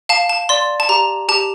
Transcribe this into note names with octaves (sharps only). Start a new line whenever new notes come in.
F5 A5
A5
D5 C6
A5
G4 A#5
G4 A5